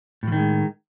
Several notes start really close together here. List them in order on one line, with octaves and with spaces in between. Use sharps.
A2 F3 D#3 G#3